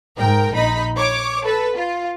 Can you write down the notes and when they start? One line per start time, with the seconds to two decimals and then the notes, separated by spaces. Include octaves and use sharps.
0.18 G#2 A#4 G5
0.54 A#1 D#4 B5
0.97 C#5 D6
1.45 A4 B4
1.76 F4